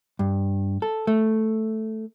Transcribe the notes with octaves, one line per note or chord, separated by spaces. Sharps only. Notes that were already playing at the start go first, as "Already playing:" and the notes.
G2
A4
A3